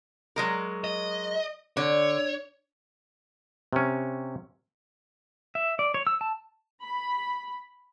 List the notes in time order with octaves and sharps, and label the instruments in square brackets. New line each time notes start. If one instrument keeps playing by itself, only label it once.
[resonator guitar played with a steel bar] F#3 G#3 A#4
[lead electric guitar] D#5
[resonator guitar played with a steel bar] D3 [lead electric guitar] C#5
[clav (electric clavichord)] C3 C#4
[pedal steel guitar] E5
D5
C#5
E6
A5
[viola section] B5